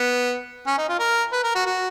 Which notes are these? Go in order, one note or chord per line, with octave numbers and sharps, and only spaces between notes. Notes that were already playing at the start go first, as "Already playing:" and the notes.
Already playing: B3
C#4
D#4
F4
A#4
B4
A#4
F#4
F#4